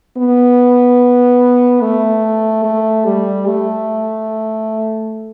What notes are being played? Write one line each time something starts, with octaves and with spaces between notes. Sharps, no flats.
B3
A3
A3
G3
A3